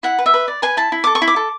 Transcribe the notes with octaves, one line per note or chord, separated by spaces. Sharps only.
E4 F#5
B4
E5
B4
D5
B4 G#5
E4 A5
E4
A4 D6
C#6
E4
D6
A4